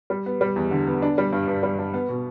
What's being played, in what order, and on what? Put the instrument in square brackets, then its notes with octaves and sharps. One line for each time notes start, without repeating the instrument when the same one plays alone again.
[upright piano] G3
B3
G3
E2
D3
B3
D4
G3
G2
G2
G3
G2
B3
B2